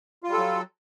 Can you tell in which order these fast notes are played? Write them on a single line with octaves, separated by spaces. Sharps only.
F4 G3 A4 F#3